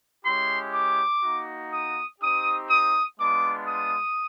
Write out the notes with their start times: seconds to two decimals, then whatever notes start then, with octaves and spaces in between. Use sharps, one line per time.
0.24 G#3 C#4 E4 G4 C6
0.73 D6
1.23 A#3 D#4 F#4
1.72 D#6
2.21 C4 D#4 G4 D#6
2.70 D#6
3.19 G#3 B3 D4 F4 D6
3.68 D#6